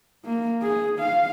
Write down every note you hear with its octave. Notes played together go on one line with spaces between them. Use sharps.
A#3
G#4
F5